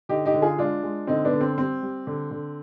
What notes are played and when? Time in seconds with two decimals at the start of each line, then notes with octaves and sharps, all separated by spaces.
0.09 D3 D#4 G4
0.25 D#4 G4
0.34 D3
0.42 F4 G#4
0.58 G#3 D4 F4
0.83 G#3
1.07 D3 C4 D#4
1.25 B3 D4
1.33 D3
1.41 C4
1.58 G3 C4
1.82 G3
2.07 D3
2.31 D3